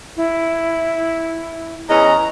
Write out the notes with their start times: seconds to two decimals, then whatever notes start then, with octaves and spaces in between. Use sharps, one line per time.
0.17 E4
1.89 E2 C#4 D#5 A#5